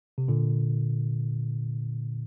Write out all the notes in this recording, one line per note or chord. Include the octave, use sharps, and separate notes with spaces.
C3
A#2 D3